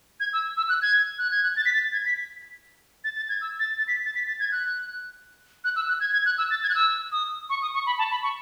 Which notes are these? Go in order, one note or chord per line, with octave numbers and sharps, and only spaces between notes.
G#6
E6
E6
F#6
G#6
F#6
G#6
F#6
A6
B6
A6
G#6
B6
A6
A6
G#6
E6
A6
A6
B6
A6
B6
A6
G#6
F#6
F#6
E6
F#6
G#6
G#6
F#6
E6
A6
G#6
F#6
E6
D#6
C#6
D#6
C#6
B5
A5
B5
C#6